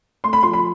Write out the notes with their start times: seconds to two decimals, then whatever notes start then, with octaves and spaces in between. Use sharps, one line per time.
0.24 A3 C6
0.33 B5
0.43 F3 C6
0.53 B5